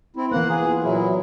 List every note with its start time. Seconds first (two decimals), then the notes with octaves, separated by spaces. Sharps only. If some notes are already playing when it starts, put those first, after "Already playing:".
0.16 C4 E4
0.32 E3 A#3 B3 F#5
0.50 G#4
0.64 F4
0.84 A#2 F#3 E4